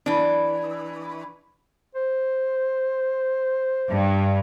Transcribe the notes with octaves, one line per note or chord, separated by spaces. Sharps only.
E3 D4
C5
G2